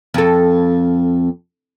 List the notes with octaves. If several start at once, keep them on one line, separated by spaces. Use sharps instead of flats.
F2 A4